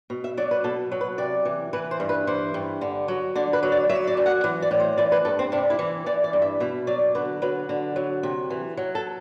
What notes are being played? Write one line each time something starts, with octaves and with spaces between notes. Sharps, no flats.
B2
E5
F#3 D5
B4
B2 A4
F#3
B4
C3 D5
E3
E3 B4
C5
G2
B4
E3 C5
G2
D3
F#3
D3 D5
B4
F#3
D5
F#3 E5
D5
F#2
F#5
E3
D5
A2
C5
E3 D5
B4
G2 A4
C4
C3 D4
E4
E3
E3 D5
D5
G2
E5
B2 E5
F#3 D5
D3 B4
F#3 B4
D3
F#3
C3
E3
F#3
A4